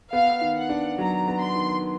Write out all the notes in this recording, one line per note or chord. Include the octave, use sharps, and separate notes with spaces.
B3 F5
D#3
F#5
D4
F#3 A#5
B3
C6
D#3